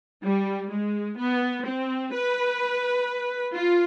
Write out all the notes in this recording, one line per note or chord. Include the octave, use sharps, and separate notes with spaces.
G3
G#3
B3
C4
B4
F4